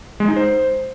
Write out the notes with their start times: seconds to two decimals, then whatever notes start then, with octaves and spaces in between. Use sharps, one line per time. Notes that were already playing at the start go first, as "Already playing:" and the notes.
0.20 G#3
0.28 D#4
0.36 C5